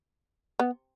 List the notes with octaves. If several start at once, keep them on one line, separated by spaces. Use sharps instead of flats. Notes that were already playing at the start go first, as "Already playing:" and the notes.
B3